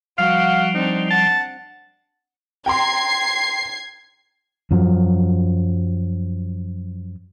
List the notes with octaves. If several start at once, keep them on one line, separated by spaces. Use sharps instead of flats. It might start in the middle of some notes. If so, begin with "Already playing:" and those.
F3 G3 F#4 F5 F#5
C4 D4 D#4
F#5 A5
G5 A#5 C6 G#6 C7
F#2 F3 F#3